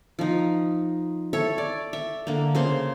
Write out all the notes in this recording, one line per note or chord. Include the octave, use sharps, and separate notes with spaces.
F3 D#4
A4 C#5 E5
D5
E5
D3 A#3
C#3 A#3 C5 C6